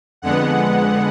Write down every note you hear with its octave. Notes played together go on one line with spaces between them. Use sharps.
F2 D3 G#3 B3 F#5